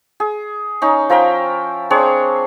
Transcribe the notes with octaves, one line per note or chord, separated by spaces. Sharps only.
G#4
C#4 D#4
F3 A#4 E5 G5
C4 D4 G#4 C#5